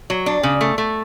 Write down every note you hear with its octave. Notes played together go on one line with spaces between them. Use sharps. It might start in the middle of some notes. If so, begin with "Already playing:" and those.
F#3
D4
C#3
A3
A3